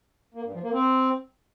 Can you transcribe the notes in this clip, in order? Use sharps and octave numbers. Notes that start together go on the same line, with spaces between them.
A#3
G2
F3
A#3
C4